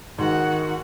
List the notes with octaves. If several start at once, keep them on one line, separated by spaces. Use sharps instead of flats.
G#2 D#3 F#4 F#5